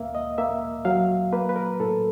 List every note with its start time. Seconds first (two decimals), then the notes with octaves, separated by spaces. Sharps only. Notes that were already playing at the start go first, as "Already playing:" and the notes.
Already playing: D2 A#3 E5 F5
0.15 D#5
0.38 A#3 E5
0.85 F#3 F5
1.33 A#3 B4
1.49 B4
1.56 A#4
1.80 A2 A4